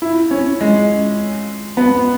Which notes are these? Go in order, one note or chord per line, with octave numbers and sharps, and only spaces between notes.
E4
C#4
G#3
B3